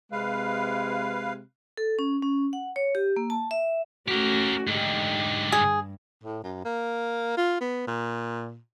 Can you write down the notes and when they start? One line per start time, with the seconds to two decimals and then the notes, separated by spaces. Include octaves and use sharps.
0.12 C3 G#3 B4 F5
1.77 A4
1.99 C#4
2.22 C#4
2.53 F#5
2.76 C#5
2.95 G4
3.16 A#3
3.30 A5
3.51 E5
4.08 A3 C#4 F#4 G4 A#4
4.67 G#2 D3 D#4 G4
5.52 G2 G#4
6.23 A2
6.43 F#2
6.65 A#3
7.37 F4
7.60 B3
7.87 A#2